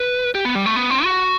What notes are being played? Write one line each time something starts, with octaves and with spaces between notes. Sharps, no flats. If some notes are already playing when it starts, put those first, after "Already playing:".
Already playing: B4
G4
B3
G3
A3
B3
C4
F#4